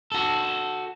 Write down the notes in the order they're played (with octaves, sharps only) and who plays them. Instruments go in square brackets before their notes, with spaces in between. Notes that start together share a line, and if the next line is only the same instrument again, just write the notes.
[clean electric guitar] F#4 A4